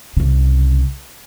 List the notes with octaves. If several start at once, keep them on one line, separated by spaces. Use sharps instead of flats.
C2 C#3